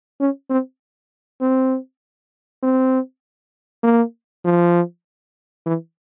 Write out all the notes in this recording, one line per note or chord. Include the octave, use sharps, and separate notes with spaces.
C#4
C4
C4
C4
A#3
F3
E3